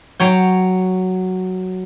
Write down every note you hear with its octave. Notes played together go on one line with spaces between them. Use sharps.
F#3 C#5 G5